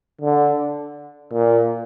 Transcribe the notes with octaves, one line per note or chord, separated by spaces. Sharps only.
D3
A#2